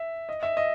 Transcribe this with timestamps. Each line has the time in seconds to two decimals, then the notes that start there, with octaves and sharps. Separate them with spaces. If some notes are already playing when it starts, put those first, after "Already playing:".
Already playing: E5
0.29 D#5
0.43 E5
0.57 D#5